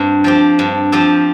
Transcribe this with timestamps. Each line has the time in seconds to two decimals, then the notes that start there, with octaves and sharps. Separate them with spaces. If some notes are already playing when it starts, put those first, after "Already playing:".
Already playing: G2 C4 G4
0.24 F3 C4 G4
0.59 G2
0.92 F3 C4 G4